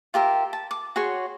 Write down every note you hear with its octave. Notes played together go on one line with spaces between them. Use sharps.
F4 G4 A#4 E5
A5
D6
F#4 G#4 C#5 C6